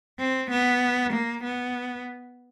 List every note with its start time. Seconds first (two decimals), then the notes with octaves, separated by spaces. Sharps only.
0.19 C4
0.50 B3
1.13 A#3
1.43 B3